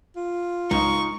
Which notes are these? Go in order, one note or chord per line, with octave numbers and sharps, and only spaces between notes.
F4
C#2 D#4 C#6